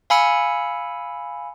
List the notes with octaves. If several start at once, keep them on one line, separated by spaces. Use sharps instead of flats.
F5 G#5 B5 E6 C#7